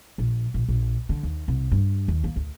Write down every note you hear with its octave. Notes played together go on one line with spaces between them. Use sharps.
A#1
A#1
A#1
D3
D#2
C2
G2
D#2
A#3
D2